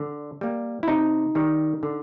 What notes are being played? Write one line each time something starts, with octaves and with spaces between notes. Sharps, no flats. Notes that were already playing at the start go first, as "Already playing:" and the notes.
Already playing: D3
G3 A#3
E4
C3 D#4
D#3 G3
D3